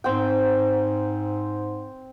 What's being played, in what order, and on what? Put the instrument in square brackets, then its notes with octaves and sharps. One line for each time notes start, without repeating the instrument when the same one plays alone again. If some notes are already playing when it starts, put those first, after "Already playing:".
[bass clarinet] G#2 [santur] C4 G5